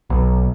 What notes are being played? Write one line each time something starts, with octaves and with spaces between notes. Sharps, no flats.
B1